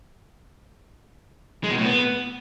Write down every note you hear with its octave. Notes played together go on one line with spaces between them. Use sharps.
G#3
B2
A2
B3